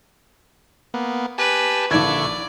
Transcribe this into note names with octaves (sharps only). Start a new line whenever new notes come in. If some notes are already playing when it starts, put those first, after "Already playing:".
A#3 B3
G4 B4 G#5 A5
A#1 D3 E4 D5 C#6 G#6